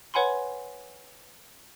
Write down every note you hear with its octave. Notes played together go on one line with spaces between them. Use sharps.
B4 C#5 F#5 G#5 B5 C6